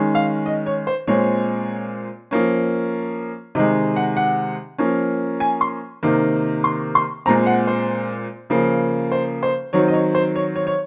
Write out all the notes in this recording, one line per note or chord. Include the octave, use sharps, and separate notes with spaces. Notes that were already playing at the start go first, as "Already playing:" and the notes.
Already playing: D#3 G#3 C#4
F5
D#5
C#5
C5
A#2 G#3 C4 C#5
F3 A#3 C#4
C3 D#3 G#3 D#5
F#5
F#5
F3 A#3 C#4
G#5
C6
C3 D#3 A#3
C6
C6
A#2 G#3 C4 A#5
F#5
C5
C#3 F3 A#3
C5
C5
D#3 F#3 C4 C#5
D#5
C#5
C5
C#5
C#5
C#5